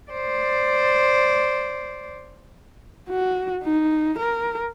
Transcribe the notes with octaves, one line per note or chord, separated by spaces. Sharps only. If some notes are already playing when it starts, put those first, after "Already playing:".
C5 D5
F#4
D#4
A#4